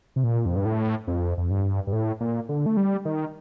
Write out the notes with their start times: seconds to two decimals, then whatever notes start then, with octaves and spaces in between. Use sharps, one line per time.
0.16 C3
0.24 A#2
0.46 F2
0.56 G2
0.65 A2
1.07 F2
1.38 F2
1.50 G2
1.87 G2
1.93 A2
2.20 A#2
2.49 D3
2.66 A3
2.77 G3
3.05 D#3